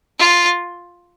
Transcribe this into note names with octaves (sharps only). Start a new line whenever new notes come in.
F4